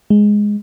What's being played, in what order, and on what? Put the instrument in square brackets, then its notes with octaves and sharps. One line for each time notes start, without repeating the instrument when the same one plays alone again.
[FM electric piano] G#3